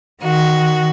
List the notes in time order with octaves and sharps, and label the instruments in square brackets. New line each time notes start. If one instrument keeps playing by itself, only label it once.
[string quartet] D#3 F#4